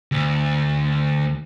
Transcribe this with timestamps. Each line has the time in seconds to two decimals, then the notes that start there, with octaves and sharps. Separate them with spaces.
0.12 D2